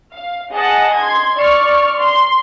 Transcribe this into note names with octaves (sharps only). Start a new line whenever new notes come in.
F5
G#4 D#5 F#5 A5
C6 G#6
D5 C#6 F6
C6